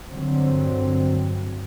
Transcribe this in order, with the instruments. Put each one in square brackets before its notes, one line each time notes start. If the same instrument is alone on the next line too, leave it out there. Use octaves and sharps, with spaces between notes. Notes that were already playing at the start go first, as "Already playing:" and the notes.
[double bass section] G2 D3 F#3 C4